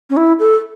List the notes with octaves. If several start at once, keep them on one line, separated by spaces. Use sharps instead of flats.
C#4
E4
A4